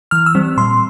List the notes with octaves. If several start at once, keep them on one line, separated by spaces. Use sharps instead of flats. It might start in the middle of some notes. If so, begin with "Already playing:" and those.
E3 F6
E6
G3 C4
A#2 C6